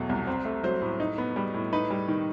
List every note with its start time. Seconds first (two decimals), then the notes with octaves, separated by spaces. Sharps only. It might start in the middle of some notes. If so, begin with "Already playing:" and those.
Already playing: E2 B2 F#3 A3
0.09 C2
0.27 C4
0.45 A3
0.64 F#3 C5
0.82 A2
1.00 D#4
1.18 B3
1.36 G3
1.54 A2
1.73 D#4 B4
1.90 G3
2.08 D#3